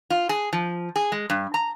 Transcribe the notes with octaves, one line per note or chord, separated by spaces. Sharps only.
F4
G#4
F3
G#4
G#3
G2
A#5